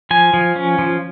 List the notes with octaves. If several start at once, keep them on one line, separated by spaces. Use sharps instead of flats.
F3 G#5
F3
C#4
F3